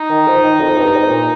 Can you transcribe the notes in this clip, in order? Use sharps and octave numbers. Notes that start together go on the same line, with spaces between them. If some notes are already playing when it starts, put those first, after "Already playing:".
Already playing: D#4
D#3
F3
D#3
F2
G2
G#2
A#2